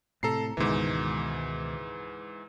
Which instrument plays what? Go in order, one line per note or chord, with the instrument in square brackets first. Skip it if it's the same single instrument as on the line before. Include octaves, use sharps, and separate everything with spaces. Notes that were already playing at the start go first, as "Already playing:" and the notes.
[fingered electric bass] A2 C3 [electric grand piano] A4 A#5 C7
[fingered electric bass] C#2 B2 D#3 [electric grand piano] G#2 E3